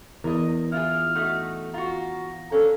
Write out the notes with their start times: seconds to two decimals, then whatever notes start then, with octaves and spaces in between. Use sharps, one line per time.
0.24 E2 A#4 D#5
0.72 E4 F4 G#4 F6
1.15 A3 D#4 F#4
1.74 F4 F#4 A#5
2.52 C#4 D4 A4 F5